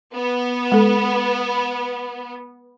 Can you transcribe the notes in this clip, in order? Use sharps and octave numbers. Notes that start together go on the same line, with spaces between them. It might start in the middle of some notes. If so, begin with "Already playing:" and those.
B3
G#3 A4